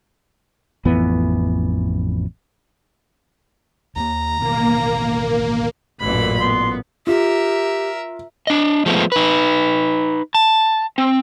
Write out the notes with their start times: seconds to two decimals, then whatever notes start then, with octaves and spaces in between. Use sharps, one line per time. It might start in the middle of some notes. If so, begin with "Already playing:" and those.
0.85 A1 F2 E3 B3
3.96 D#2 G3 A#3 A#5
4.39 A1 B2 D#3 A#3
6.00 A1 F#2 A#2 E3 B5
6.40 B3 C6
7.07 F4 G4 A#4 E5
8.47 D4 D#5
8.86 F3 G#3 A3 B3
9.12 D#4 B4
10.35 A5
10.98 C4